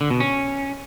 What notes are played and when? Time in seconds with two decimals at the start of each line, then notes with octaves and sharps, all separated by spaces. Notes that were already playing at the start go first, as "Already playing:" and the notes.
0.01 D3
0.10 B2
0.20 C#4